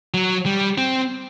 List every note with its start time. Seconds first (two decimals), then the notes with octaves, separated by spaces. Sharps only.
0.14 F#3
0.46 G3
0.78 C4